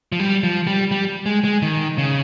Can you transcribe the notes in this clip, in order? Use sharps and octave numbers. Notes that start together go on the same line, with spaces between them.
F3
G3
F3
G3
G3
G#3
G#3
D#3
C#3